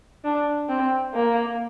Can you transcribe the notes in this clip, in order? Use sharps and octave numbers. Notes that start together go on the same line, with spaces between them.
D4
C4
A#3